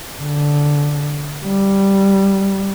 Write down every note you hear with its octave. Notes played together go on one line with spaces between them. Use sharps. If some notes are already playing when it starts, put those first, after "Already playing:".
D3
G3